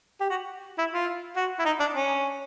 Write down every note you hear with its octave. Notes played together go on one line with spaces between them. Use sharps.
G4
F#4
E4
F4
F#4
E4
D#4
D4
C#4